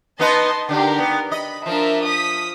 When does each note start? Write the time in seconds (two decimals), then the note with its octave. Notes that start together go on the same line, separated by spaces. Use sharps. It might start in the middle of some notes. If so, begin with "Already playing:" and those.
0.19 B3 D#4 B4 D#5 A5 C6
0.69 D3 D4 D#4 G4 A#4
0.99 B3
1.32 D#5 B5
1.66 F3 D4 A#4 E5
2.06 D#6 B6